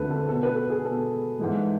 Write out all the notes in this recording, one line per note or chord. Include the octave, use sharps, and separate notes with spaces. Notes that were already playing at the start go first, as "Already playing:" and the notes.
Already playing: D2 D3 A3 C4 A4 B4
A4
B2 B3 A4
B4
A4
G#4
B2 B3 A4
G#2 E3 G#3